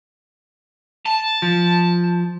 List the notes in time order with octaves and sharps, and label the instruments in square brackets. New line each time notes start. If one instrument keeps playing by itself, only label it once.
[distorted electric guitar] A5
[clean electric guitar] F3